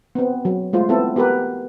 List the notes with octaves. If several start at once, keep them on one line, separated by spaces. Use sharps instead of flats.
B3 C4
F#3
G#3 A3 F4 C5
B3 C4 E4 A4
B3 G4 A#4 B4